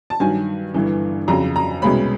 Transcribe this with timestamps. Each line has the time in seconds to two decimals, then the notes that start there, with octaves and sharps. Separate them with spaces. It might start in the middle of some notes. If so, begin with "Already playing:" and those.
0.10 A5
0.20 G2 D#3 F#3 G#5
0.74 G1 G2 E3
1.28 F2 C#3 F#3 A#5
1.56 A#5
1.82 C2 B2 G#3 C#4 B5